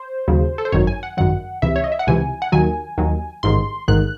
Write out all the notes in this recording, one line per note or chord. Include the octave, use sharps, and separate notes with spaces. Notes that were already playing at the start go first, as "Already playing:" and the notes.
Already playing: C5
D#2 C#3 F#3
A4
C5
G#1 F#2 D#3 F#3 C#5
G#5
F#5
G#1 F#2 D#3 F#3 F#5
C#2 C3 E3 E5
C#5
D#5
E5
F#5
C#2 C3 E3 G#5
F#5
D#2 D#3 F#3 G#5
D#2 D#3 F#3
A1 G#2 D#3 C6
A1 G#2 D#3 F#6